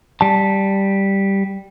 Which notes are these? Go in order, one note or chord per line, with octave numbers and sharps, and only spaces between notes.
G3 A5